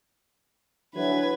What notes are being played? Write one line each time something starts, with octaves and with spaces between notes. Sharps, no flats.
D3 E3 F#3 B4 G#6